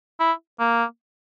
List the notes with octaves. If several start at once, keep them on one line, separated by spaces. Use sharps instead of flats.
E4
A#3